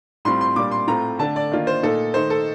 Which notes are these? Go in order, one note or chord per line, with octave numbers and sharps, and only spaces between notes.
A2 G3 C4 F4 C6
C6
A#2 G3 D4 D6
C6
A2 A3 C4 F4 A#5
D3 A3 D4 A5
D5
D#3 A#3 D4 F4
C5
A#2 A3 D#4 A4
D#3 A3 D#4 C5
A4